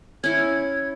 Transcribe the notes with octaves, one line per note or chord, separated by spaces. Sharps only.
C#4 E4 G#6